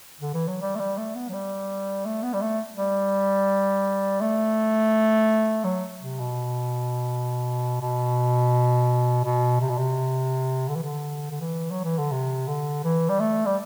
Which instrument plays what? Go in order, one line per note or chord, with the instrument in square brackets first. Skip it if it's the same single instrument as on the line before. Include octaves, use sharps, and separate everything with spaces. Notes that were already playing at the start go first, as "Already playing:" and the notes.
[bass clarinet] D3
E3
F#3
G3
A3
G3
A3
B3
F#3
G3
A3
B3
G3
A3
G3
A3
F#3
C3
B2
B2
B2
C3
B2
C3
D3
E3
D3
D3
E3
F#3
E3
D3
C3
D3
E3
G3
A3
G3